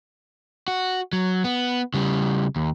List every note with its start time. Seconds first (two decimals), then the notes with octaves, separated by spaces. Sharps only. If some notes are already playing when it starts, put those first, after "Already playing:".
0.68 F#4
1.13 F#3
1.44 B3
1.94 C#3 G3
2.56 D#2